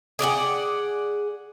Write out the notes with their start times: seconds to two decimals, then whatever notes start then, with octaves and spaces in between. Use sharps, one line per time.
0.19 G#4 D5 D#5 F#5